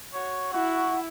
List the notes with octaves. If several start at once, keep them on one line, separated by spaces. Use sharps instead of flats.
F#4 C#5
E4 F#4 F#5